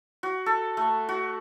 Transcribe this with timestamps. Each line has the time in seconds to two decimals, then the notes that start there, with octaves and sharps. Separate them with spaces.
0.23 F#4
0.46 A4
0.77 A3
1.09 F#4